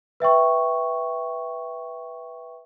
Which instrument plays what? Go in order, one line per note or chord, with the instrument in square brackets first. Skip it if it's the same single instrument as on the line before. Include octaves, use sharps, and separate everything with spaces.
[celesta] B4 E5 G5 C#6